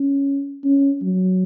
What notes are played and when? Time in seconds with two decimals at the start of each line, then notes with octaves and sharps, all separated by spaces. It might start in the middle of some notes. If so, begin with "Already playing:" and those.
Already playing: C#4
0.64 C#4
1.02 F#3